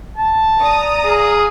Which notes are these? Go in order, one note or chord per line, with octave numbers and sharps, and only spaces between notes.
A5
D5 A#5 D#6
G#4 F5